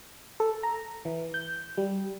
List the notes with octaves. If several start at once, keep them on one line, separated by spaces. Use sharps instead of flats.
A4
A#5
E3
G6
G3